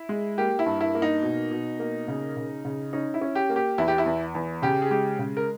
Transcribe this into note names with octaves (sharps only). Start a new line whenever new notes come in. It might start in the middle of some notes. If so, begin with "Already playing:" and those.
Already playing: E4
G#3
A#3 G4
E4
G2
E4
A#3
D#4
B2
B2
A#3
C#3
C#3
C#3
C#4 D#4
E4
C#4
G4
A#3
G4
E2 E4
G4
E4
E2
E2
C#3 G4
G#4
G#3 G4
C#3
A#4